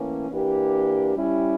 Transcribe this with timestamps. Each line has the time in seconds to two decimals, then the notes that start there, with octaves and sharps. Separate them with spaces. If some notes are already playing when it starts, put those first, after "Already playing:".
Already playing: A2 E3 A#3 C#4
0.29 E3 A#3 D4 G4
1.15 G3 C#4 E4 G4